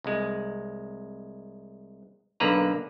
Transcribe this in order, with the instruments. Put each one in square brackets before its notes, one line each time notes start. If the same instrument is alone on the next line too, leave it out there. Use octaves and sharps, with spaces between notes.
[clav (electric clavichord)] C2 G#3
B1 D3 A#3 B4 A#5